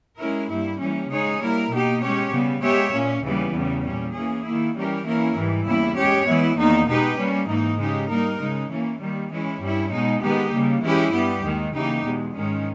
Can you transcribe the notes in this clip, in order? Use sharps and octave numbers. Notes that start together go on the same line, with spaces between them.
G#3 C#4 E4 A#4
G2 G3 A#3 E4
E3 G3 A#3 C#4
C#3 G#3 D#4 G#4 C#5
G3 A#3 E4 A#4
B2 A#3 D#4 G4
G#3 C#4 G4 C#5
C#3 G3 B3
G#3 B3 G4 C#5 E5
A#2 A#3 C#4
D#2 C#3 E3 G3 B3
E2 C#3 G3
A#2 G3 C#4
E3 A#3 C#4 G#4
D#3 A#3 E4
E3 G3 C#4 G4 A#4
E3 A#3 C#4 E4 A#4
G#2 E3 G3
E2 C#3 G3 A#3 E4
G#3 C#4 G4 C#5
E3 G#3 B3 E4
E2 D#3 A#3 D#4
B2 G#3 D#4 G4 B4
G3 A#3 C#4
G#2 E3 A#3 D#4
C#3 G#3 D#4 G4
G3 A#3 D#4 A#4
C#3 G#3 D#4
E3 A#3 C#4
D#3 G3 A#3
E3 G#3 C#4 E4
G2 G3 C#4 E4
B2 G#3 D#4
D#3 G#3 B3 D#4 G4
C#3 G3 A#3
E3 G#3 C#4 E4 G4
G2 G3 B3 G4
D#2 D#3 G#3
C#3 E3 A#3 D#4 G4
E2 B2 G#3
G#2 D#3 G#3 C#4